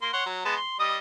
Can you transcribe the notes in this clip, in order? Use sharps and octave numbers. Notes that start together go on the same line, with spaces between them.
A#3 C6
C#5 F#5 C6
F#3
G#3 B3 A5
C6
G3 D#5 D#6